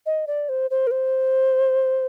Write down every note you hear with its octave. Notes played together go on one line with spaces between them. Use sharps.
D#5
D5
C5
C5
A#4
C5